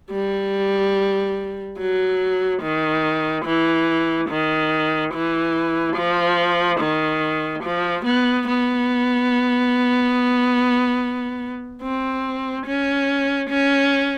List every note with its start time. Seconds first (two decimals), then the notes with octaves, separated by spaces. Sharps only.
0.11 G3
1.78 F#3
2.62 D#3
3.45 E3
4.29 D#3
5.14 E3
5.96 F3
6.80 D#3
7.63 F3
8.06 B3
8.48 B3
11.83 C4
12.67 C#4
13.49 C#4